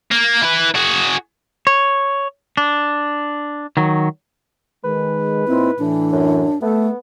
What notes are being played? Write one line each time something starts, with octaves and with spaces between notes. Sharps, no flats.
A#3
E4 B4
F#4 G#4
C#5
D4
D#3 F#3
D#3 G#3 B4
A#2 C4 D#4 E4
A2 E3 D4
F#2
A3 B3 A4